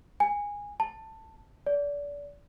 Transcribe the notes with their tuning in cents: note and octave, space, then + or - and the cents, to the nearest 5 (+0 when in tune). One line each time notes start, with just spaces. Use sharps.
G#5 -20
A5 +10
D5 -30